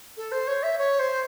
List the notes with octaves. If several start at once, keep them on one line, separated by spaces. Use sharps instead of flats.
A4
C5
C#5
E5
C#5
C5